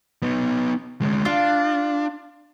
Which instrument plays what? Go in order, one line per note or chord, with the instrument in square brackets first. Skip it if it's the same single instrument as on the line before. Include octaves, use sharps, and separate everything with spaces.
[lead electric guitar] B3 D#4
D2 G#3
[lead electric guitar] D4 [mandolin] F4